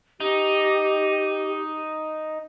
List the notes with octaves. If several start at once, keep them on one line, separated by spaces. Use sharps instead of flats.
D#4 G4